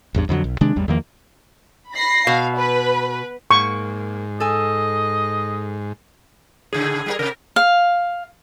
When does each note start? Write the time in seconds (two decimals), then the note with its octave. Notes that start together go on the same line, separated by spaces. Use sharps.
0.14 A1 E2 G2
0.29 F2 D3 E3 F#3
0.44 B1
0.61 C3 D#3 G#3 D4
0.76 A1 E2 G3
0.88 E2 D#3 F3 A#3
1.94 B5 A#6 C7
2.27 B2 F5
2.57 B4
3.51 G#2 A#3 C#6
4.40 A4 D#5 G#5
6.73 A2 C#3 G#4
7.06 G3 F#4 A#4
7.19 C3 A#4
7.56 F5